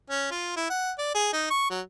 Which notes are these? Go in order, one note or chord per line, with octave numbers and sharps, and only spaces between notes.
C#4
F4
E4
F#5
D5
G#4
D#4
C#6
F#3